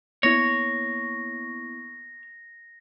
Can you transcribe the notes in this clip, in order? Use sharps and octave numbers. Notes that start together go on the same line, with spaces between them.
A#3 B3 E4 C#5 A#6